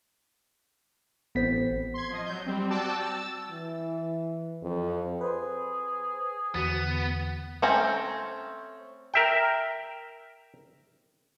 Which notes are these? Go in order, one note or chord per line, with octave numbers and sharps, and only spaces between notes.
A1 B3 C4 C5 B6
C6 G#6
F3 D#5
F#3 G6
G3 C4
F#4 D5 G5 A5 D6 E6
E6 A6
E3
F2
G#4 B4 C5
E2 D3 B3 F#4 A6
A3 C4 C#4 A#5
A#4 E5 G5